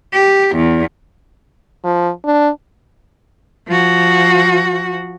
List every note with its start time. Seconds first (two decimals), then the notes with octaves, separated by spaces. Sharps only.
0.13 G4
0.55 E2
1.85 F3
2.25 D4
3.68 F3 F#4